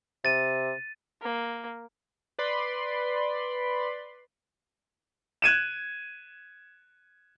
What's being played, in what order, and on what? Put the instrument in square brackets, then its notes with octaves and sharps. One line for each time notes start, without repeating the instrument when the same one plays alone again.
[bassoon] C3 [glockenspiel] A6 D#7
[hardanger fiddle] A#3
[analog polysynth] B4 D5 B5 C6
[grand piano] F#6 G#6 D#7 E7